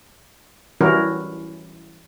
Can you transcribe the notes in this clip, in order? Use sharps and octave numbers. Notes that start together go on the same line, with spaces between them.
E3 G3 C#4 E4 F#4 A#4